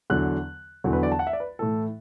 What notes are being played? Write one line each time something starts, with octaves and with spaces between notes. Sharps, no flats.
E2 D3 F#3 F#6
E2 D3 F#3
B4
D5
A5
F#5
E5
D5
B4
A2 E3 A4